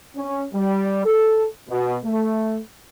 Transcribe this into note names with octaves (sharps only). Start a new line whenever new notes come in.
C#4
G3
A4
B2
A3